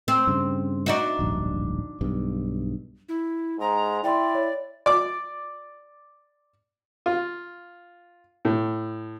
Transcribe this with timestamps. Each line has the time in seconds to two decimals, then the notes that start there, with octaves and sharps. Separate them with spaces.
0.08 C4
0.27 G2 C#3
0.86 D4 D#4 F#4
1.19 D1 A#1 G2
2.01 B1 G2
3.09 E4
3.60 G#2 A#5
4.04 E4 D5 G5 C6
4.35 C#5
4.86 D5 D6
7.06 F4
8.45 A2